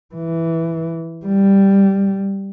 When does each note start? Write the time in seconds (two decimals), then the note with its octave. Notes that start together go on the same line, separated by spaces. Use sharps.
0.15 E3
1.26 G3